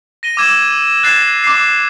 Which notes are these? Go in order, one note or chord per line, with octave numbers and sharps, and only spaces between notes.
A#6 D#7 G7
D6 E6 G#6 E7
F#6 G#6 A6 C7 E7
D6 C7